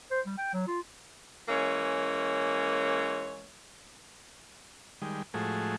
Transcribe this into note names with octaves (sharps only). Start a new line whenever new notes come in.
C5
G3
G5
F#3
F4
E3 G#3 A#3 C#4 C#5
D#3 G3 G#3
A2 F3 G#3 A3 F#4 G#4